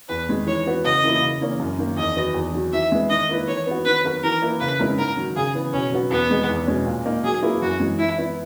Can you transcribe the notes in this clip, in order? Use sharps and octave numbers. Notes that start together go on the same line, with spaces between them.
E2 B4
D#3 G#3
E3 C#5
B3 F#4 B4
C#3 D#5
E3 A#3 E4
C#3
E3 A#3 C#4
F#2
D#3 A#3
E2 D#5
D#3 F#3 B3
E2
D#3 F#3
E3 E5
G#3 B3
D#3 D#5
A#3 E4 B4
E3 C#5
B3 F#4
D#3 B4
F#3 B3 F#4 A#4
E3 A#4
A#3 E4 B4
C#3 B4
G#3 C#4 E4 A#4
G#2 A#4
D#3 F#3
C#3 G#4
E3 B3
B2 C#4
F#3 B3 F#4
E2 B3
D#3 G#3 D#4 G#4
E2
B2 G#3 C#4
A#2
A#3 D#4 A#4
F#3 G#4
A#3 E4 G#4 B4
F#2 F#4
E3 G#3
E3 E4
B3 E4